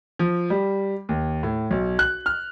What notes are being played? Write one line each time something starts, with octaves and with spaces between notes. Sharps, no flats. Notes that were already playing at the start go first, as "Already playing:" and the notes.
F3
G3
D#2
A2
B1
F#6
F6